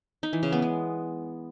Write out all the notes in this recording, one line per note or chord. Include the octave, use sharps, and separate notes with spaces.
D#4
E3
C#3
B3
G#3